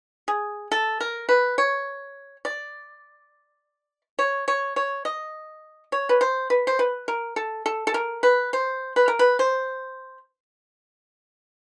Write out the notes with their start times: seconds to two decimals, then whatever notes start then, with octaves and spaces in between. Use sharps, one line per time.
0.28 G#4
0.72 A4
1.00 A#4
1.29 B4
1.58 C#5
2.45 D5
4.19 C#5
4.48 C#5
4.76 C#5
5.05 D#5
5.92 C#5
6.09 B4
6.21 C5
6.50 B4
6.67 C5
6.79 B4
7.08 A#4
7.36 A4
7.66 A4
7.87 A4
7.94 A#4
8.23 B4
8.53 C5
8.96 B4
9.08 A#4
9.19 B4
9.39 C5